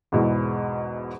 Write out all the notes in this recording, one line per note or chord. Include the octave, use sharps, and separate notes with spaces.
E2 G#2 B2 E3